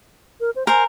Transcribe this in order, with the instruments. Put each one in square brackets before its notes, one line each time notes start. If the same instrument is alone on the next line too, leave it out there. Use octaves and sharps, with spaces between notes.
[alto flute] A#4
C5
[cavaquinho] A#4 C5 [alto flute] G#5